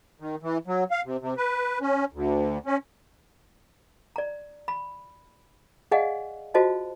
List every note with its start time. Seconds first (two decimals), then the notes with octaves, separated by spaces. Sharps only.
0.20 D#3
0.43 E3
0.67 F#3
0.91 F5
1.05 C3
1.21 C3
1.37 B4
1.81 C#4
2.13 D2
2.66 C#4
4.16 D5 A#5
4.68 B5
5.91 G#4 D5 D#5 F5 F#5 G#5
6.54 F4 F#4 C5 D#5 A5